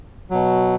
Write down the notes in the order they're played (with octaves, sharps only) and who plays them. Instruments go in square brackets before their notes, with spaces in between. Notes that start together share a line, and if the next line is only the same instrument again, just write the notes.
[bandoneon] B2 F#3